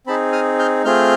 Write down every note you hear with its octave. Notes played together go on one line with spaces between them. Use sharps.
C4 D#4 G#4 A5 B5
D#6 F6
F6 G6
A3 C4 F4 G#4 F6 G6